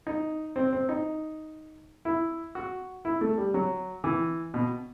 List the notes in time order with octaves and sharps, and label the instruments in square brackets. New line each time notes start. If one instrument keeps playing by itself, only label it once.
[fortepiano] D#4
C4
C4
D#4
E4
F#4
E4
A3
G3
F#3
E3
B2